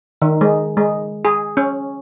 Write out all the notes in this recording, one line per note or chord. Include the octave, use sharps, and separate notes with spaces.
D#3
G#3
G#3
G#4
C#4